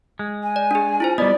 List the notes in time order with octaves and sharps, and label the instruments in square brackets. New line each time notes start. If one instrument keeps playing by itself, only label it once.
[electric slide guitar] G#3
[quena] G#5
[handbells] D5
D4 G#4
E4 F4 C5
[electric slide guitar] G3 B3 [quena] D5 [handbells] D#5